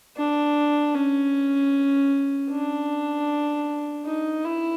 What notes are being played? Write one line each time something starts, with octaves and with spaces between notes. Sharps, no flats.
D4
C#4
D4
D#4
E4